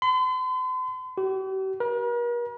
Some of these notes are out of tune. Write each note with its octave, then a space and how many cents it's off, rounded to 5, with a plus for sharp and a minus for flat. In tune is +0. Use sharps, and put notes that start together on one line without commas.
C6 -45
G4 -45
A#4 +45